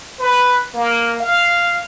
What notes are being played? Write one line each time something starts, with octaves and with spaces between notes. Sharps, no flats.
B4
A#3
F5